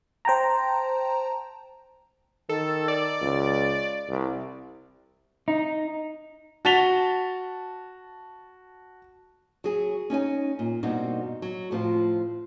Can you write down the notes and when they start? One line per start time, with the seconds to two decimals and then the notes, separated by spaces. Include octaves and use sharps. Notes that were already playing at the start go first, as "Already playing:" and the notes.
0.25 C5 G5 A5 A#5
2.49 D#3 A4
2.88 D5
3.21 C#2
4.09 C2
5.48 D#4
6.65 F#4 A5 A6 B6 F7 G7
9.64 F#3 G#4
10.10 C#4 D#4 C#5 G#5
10.59 A#2
10.83 G2 B2 A#3 C4 D#4 F#4
11.42 F#3
11.71 A2 F3 C4 F4